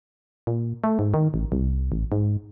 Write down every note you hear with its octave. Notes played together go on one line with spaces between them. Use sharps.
A#2
A3
G#2
D#3
A1
C2
A1
G#2